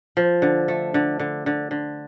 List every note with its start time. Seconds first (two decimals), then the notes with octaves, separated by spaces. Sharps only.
0.17 F3
0.42 D3
0.68 A3
0.94 D3
1.19 D3
1.46 D3
1.71 D3